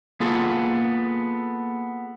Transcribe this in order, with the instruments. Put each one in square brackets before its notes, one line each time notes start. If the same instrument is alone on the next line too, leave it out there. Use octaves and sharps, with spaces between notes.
[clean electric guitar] A#3 B3 F4 G#4 A4